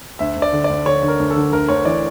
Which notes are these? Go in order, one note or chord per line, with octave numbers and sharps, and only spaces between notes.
D2 E5
D2
D5
D3
D5
D2
D3 C#5
D3
A#4
D2
A4
D3
D2 A#4
D2 C#5
E3 D5